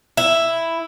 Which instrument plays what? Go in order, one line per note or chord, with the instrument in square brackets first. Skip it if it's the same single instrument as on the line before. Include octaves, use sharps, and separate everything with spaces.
[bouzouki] E4